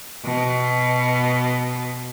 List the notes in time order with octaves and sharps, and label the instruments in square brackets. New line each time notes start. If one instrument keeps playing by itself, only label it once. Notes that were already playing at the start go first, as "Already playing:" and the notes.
[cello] B2